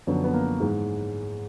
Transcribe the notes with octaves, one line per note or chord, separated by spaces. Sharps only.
F#2 D3 F3 B3
B3
A#3
G#2 E3 G#3